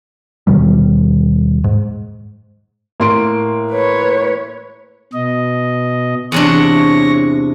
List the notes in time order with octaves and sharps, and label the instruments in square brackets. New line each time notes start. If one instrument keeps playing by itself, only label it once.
[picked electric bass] D#2 B2 D#3 G3
G#2
[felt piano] A2 C6 D7 [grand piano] A#3
[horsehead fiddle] B4 C#5
[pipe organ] B2 D#5
[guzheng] E2 C3 D4 [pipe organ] C#5 C#6 A#6